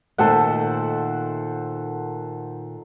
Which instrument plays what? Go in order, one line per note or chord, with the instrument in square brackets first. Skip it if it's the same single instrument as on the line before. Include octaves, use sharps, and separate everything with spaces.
[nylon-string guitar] A#2 D#3 A3 [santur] A4 C5 F#5